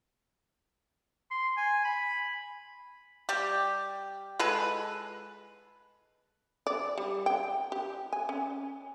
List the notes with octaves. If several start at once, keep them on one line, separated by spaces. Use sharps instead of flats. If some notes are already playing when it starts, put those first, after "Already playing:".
C6
G#5
B5
G3 G4
G#3 A4 B4
D5
G3
G5
G4
G#5
C#4